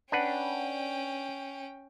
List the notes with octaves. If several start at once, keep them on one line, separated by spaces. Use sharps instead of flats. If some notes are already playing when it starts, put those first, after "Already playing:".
C#4 D4 B4 F#5 G5